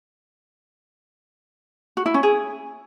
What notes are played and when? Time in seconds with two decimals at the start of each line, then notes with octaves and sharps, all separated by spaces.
1.97 F#4
2.06 E4
2.14 C#4
2.23 G#4